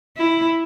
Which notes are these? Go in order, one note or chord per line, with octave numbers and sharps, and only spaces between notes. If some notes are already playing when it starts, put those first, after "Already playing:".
E4